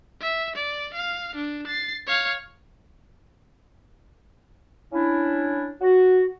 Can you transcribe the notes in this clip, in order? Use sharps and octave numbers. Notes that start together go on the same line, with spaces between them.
E5
D5
F5
D4
A6 C7
C#5 F5
C#4 D4 E4
F#4